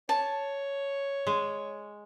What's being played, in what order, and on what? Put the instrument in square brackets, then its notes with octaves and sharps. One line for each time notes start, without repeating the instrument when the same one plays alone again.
[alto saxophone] C#5 [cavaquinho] A5
[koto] G#3